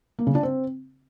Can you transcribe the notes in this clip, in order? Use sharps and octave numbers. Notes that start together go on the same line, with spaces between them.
A#3
C#3
D4
C4